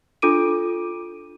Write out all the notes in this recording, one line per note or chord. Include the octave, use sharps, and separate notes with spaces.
D4 F4 A4 D6 D7 D#7